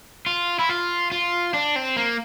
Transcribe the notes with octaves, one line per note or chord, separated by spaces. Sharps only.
F4
E4
F4
F4
D4
C4
A#3